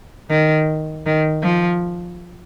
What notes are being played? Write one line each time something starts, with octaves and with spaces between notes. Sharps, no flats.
D#3
D#3
F3